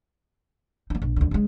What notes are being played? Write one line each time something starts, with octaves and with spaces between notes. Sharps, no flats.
A#3 D#4
A#1
D2 D3
C#3 G#3